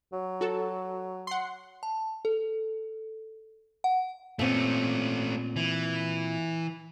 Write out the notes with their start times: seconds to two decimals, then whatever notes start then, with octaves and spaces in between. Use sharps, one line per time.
0.13 F#3
0.41 F#4 A4
1.27 F#5 C6
1.83 A5
2.25 A4
3.84 F#5
4.39 A#2 A3 C4 C#4
5.56 E3